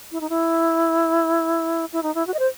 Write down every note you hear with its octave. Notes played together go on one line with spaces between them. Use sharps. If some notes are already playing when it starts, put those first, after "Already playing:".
E4
D#4
E4
E4
D#4
E4
F#4
D#5
C5